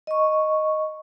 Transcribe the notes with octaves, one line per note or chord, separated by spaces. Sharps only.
D#5 C#6